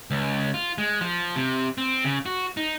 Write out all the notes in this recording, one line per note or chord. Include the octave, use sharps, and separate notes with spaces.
C#2
F4
G#3
F3
C3
C4
C#3
F#4
D#4